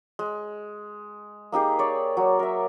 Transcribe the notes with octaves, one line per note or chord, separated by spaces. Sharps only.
G#3
A#3 D#4 G4 G#4
C#5 D5
F#3
A#4 E5